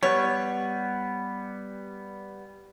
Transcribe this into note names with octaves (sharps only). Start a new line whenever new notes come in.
G3 B3 C#5